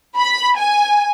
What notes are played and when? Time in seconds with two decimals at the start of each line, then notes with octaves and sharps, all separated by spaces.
0.16 B5
0.57 G#5